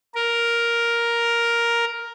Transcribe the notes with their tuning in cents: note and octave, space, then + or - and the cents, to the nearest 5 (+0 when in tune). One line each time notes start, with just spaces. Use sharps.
A#4 +5